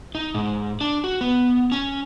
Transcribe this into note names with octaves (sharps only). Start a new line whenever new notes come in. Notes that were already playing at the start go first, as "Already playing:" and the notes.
D#4
G#2
D4
F#4
B3
C#4